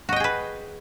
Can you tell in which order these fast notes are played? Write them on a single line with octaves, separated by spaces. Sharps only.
F#4 D#5 G5 G#4 B4